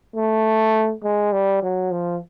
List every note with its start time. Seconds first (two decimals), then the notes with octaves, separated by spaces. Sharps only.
0.15 A3
1.04 G#3
1.33 G3
1.63 F#3
1.91 F3